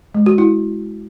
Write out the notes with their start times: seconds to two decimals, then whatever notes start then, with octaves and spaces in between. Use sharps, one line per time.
0.15 G#3
0.26 F#4
0.38 E4